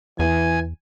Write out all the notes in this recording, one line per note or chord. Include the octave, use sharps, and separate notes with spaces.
E2 E3 G#5